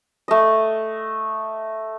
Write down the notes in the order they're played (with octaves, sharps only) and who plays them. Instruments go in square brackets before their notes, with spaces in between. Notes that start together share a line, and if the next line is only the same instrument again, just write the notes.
[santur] A3 D#5